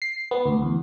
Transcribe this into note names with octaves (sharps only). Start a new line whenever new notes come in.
C7
B3
D2
E2